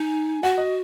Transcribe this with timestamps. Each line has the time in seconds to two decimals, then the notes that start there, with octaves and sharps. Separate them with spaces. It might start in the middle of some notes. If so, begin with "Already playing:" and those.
Already playing: D#4 G#5
0.43 F#4 F#5
0.58 D#5